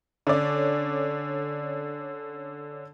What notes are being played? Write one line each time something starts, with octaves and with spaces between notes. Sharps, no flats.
D3 C#4 D5